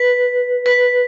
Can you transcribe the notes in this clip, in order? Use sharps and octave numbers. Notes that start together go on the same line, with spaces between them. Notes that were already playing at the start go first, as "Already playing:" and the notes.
Already playing: B4
B4